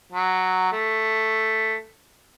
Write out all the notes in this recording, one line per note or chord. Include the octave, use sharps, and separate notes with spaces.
F#3
A3